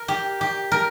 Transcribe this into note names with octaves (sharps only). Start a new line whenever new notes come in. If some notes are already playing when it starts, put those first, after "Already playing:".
Already playing: A#4
G4
G4
A#4